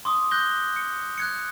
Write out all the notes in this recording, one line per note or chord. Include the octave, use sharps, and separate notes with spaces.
C6 D6 D#6
F#6 G6 A#6 G7
C#7
F#6 G#6 C#7